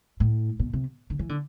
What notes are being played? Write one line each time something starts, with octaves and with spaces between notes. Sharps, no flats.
A2
B2
C3
D3
E3
D3